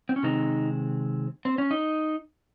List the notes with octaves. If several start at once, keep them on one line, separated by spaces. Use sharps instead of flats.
C4
C#4
C3 D#3 G#3 C4 D#4
C4
C#4
D#4